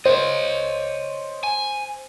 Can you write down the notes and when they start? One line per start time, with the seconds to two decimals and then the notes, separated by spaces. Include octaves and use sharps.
0.05 C5 C#5 D#5
1.43 G#5